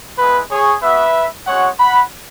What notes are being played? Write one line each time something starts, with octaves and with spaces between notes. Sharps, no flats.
G#3 B3 E4 B4
G#4 C#5
B3 F#4 B4 E5
G#3 C#4 F#4 C#5 F#5
F#5 B5